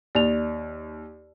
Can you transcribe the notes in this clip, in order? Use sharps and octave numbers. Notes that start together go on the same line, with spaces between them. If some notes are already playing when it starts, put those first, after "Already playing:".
D#2 D5 F7